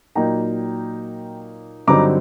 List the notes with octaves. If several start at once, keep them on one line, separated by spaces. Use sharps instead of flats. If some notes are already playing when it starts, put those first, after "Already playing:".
A#2 F#3 A#3 D#4 G5 A#5
G2 D3 F#3 C4 D#4 A#5 D6